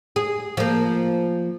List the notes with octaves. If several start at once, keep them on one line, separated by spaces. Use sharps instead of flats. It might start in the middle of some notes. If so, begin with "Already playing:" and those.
G#4
F3 A#3